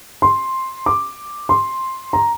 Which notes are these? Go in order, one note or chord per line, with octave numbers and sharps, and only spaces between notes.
C6
D6
C6
A#5